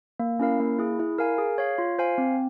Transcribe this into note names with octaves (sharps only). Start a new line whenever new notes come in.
A#3
C#4 E4 A#4 F5
A#3
E4 G#4
E4
A#4 F5 G#5
G#4
C#5 F5
F4
C5 F5 G#5
C4